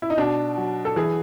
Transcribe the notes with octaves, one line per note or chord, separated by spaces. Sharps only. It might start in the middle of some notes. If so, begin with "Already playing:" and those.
E4
D#4
B2 D4
F#3
A4
E3 G#4